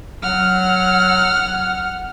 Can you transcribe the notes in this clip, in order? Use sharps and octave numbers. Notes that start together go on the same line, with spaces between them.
F#3 F#5 F6